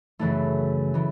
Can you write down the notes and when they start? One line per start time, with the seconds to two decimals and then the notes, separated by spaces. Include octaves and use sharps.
0.19 F#2 C#3 E3 A3 E4
0.94 C#3 E3 A3